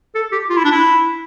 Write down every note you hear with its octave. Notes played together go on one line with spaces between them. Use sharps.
A4
G4
F4
E4
D4
E4